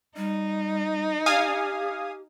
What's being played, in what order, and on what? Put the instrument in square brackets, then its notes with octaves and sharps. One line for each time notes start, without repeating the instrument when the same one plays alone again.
[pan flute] G3 [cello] D#4
[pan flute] G4 [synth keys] F5 G#5 D#6